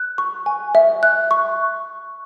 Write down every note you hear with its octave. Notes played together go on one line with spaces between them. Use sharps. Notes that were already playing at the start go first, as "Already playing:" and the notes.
Already playing: F#6
C#6
G#5
E5
F#6
C#6